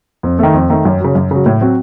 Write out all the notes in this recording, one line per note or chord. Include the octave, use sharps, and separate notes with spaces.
F2
D#3 A3
F2
D#3 A3
F#2
C#3 F#3
F#2
C#3 F#3
A2
F#3 C4 F#4